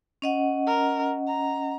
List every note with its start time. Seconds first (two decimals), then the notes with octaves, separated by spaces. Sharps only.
0.22 C#4 D#5 F#5
0.67 A#4
1.27 A#5